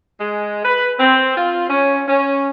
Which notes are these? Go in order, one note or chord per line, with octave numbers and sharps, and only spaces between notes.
G#3
B4
C4
F4
C#4
C#4